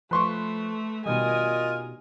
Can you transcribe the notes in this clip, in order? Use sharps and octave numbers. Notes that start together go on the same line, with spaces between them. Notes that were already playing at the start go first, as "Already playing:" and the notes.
F3 A3 B4 C6 C#6
B2 D#3 G3 F4 A#4 D#5 G#5